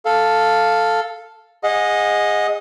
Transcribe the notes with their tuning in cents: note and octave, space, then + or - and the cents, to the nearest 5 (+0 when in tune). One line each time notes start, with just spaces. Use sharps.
A4 +0 F5 +0
G#4 -15 D#5 +5 F#5 -35